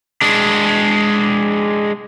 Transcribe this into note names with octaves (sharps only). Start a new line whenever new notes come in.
G#3 D4